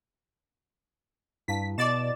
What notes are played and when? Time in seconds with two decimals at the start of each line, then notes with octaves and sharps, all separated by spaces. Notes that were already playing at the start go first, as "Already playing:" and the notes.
1.48 G2 E4 F5 A5 B6
1.78 B2 G4 D5 D#5 D6 A6 E7